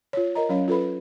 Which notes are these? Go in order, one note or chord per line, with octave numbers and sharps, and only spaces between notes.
F4 C#5
A#4 D#5 A#5
F#3 C#4 C#5 F5
F4 A4 B4 B5